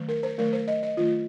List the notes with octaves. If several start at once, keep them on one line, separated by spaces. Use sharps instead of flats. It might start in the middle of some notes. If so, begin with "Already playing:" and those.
Already playing: D#3 F#3 A3
A#4
C5
D#3 F#3 A3 A#4
C5
D#5
D#5
D#3 F#3 A3 F4